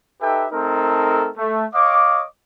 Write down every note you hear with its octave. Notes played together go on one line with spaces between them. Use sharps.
D#4 G4 A4 B4 E5 G5
A3 C4 D#4 A4 A#4
A3
C#5 D#5 F5 D6